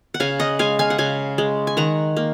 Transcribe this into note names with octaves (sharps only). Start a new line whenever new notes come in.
F#5
C#3 F5 G#5
D#5 F#5
G#3 F5 G#5
F5 G#5
F#5
C#3 F5 G#5
G#3
G#5
D#3 F#5 A#5
A#3